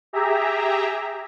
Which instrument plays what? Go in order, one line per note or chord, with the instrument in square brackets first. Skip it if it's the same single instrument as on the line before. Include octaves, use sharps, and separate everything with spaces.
[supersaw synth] G4 G#4 E5 A#5